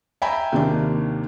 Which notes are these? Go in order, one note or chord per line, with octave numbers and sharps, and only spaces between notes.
E5 G5 G#5 A#5 B5
D#2 C3 D#3 A#3 D4